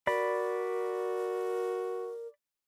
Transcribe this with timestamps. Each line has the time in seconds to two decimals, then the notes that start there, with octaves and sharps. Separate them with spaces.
0.07 F#4 A#4 D5 B5